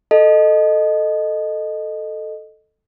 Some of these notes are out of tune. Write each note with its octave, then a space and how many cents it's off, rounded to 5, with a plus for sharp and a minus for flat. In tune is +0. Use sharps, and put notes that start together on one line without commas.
A4 +0 D#5 -10